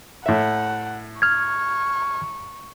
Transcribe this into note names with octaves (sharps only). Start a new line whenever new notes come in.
A2 E5 F#5
C#6 F6 G#6